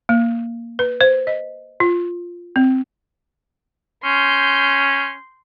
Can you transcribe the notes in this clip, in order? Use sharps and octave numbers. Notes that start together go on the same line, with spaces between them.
A#3
B4
C5
D#5
F4
C4
C#4 C6 G6